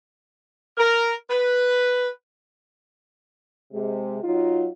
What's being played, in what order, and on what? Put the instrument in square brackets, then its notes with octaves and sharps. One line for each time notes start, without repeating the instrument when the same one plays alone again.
[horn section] A#4
B4
[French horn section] C3 G#3
F#3 D#4 F4